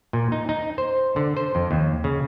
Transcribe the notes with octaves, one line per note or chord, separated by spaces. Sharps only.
A#2
D#4
D#4
C5
D3
C5
F2
D#2
C#3